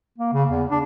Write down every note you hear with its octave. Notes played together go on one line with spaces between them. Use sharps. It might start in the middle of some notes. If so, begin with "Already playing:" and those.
A#3
C#3
E2
D4